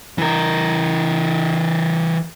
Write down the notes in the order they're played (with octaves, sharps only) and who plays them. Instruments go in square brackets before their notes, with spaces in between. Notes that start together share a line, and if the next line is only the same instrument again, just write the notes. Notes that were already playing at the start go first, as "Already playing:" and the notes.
[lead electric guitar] E3 A#4